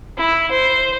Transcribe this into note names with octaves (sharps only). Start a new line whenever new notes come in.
E4
C5